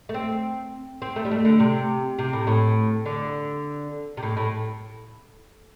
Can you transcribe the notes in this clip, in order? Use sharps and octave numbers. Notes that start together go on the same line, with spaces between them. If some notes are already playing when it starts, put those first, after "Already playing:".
A3
C4
C4
A3
G3
A3
D3
C3
C3
A2
A2
D3
C3
A2
A2